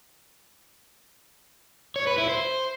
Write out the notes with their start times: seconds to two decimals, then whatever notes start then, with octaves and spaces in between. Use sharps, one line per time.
1.96 C#5
2.07 B4
2.18 E4
2.29 C5